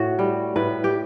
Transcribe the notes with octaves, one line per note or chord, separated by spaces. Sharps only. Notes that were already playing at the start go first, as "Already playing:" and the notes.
Already playing: A2 F#4
G3
A2 B4
G4